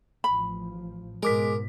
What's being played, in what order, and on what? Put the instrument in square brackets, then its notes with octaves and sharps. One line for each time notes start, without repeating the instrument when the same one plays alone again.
[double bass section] A1 F3 [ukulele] B5
[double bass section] G#2 B2 [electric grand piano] G#3 D6 B6 [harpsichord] A#4